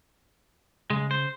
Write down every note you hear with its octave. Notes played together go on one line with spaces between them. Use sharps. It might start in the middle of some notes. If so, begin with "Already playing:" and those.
C#3 G#3
C5